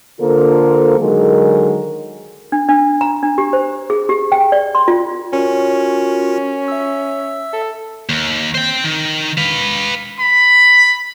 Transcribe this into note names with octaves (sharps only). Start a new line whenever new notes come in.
D3 A#3 F4 A4 A#4 C5
D3 D#3 F#3 G#3 G#4 A#4
D4
D4
A#5
D4
G4
C5
G#4
G4
G5
D5
C6
F4
C#4 F4 F#4 A#4
E5 E6
A4
D#2
C5 G5
D#3
B4 F5
B5